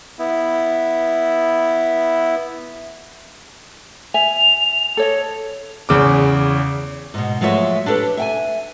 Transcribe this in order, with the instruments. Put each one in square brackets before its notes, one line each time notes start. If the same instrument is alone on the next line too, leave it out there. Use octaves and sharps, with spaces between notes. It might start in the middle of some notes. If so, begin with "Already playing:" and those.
[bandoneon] B3 E4
[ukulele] E5 G#5 [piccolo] F7
[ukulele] A4 C#5 D#5
[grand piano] E2 C#3 D6
[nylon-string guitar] G#2 B2
F3 F#3 G#3 A3 C#5 E5
D4 G4 A4 B4
E5 G5 G#5